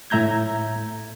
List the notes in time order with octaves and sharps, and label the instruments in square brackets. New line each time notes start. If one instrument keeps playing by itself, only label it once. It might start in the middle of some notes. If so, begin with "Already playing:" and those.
[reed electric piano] A2 E5 A#5 G6 G#6